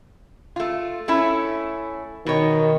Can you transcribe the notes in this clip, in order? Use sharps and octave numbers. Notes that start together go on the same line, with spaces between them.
A3 F4
A3 C#4 E4
B2 D#3 C#5